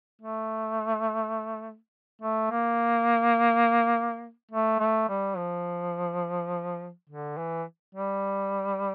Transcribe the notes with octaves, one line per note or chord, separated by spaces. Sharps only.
A3
A3
A#3
A3
A3
G3
F3
D3
E3
G3